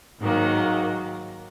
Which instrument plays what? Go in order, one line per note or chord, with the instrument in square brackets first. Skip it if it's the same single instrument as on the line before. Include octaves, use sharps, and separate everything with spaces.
[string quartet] G#2 D#3 F#3 A#3